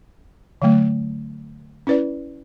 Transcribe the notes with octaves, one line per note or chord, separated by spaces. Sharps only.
D3 F#3 A3
C#4 E4 B4 D5